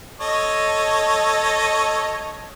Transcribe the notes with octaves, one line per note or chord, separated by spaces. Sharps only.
A4 C#5 D#5